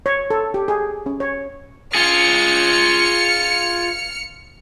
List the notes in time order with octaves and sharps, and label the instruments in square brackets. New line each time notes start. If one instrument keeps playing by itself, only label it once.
[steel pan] C#5
A4
G4
G#4
C#4
C#5
[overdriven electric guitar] F4 G#4 [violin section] F6 C#7